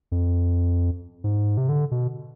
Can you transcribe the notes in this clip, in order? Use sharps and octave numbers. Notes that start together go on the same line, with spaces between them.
F2
G#2
C3
D3
B2